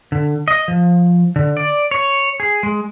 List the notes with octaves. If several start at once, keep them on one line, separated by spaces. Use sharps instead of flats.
D3
D#5
F3
D3
D5
C#5
G#4
G#3